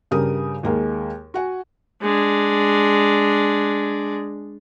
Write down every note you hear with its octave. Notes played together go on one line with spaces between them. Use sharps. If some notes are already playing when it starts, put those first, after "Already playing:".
G2 C#3 G4 A#4 D#6
D#2 G#3 A#3
F#4 F#5 G#5
G#3 D4